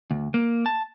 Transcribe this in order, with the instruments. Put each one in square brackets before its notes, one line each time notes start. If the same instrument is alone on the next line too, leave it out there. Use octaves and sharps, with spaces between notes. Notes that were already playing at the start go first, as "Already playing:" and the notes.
[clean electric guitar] D2
A#3
A5